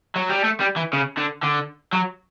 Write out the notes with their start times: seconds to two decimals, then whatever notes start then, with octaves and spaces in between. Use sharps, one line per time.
0.16 F#3
0.30 G3
0.44 A3
0.60 G3
0.76 E3
0.93 C#3
1.18 D3
1.43 D3
1.93 F#3